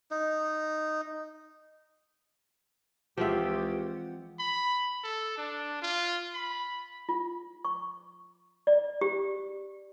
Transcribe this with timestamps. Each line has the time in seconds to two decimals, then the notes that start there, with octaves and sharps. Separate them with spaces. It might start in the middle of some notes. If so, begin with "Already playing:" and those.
0.11 D#4
3.17 C#2 E3 F3 G#3 C4 G4 E5 F#5
4.39 B5
5.03 A4
5.38 D4
5.82 F4
6.34 B5
7.09 F4
7.65 C#6
8.67 D5
9.01 G4